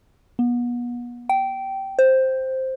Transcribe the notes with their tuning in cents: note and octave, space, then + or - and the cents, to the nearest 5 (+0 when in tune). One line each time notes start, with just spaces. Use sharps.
B3 -35
G5 -15
C5 +5